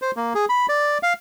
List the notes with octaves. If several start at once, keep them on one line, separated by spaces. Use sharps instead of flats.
C5
A#3
G#4
B5
D5
F5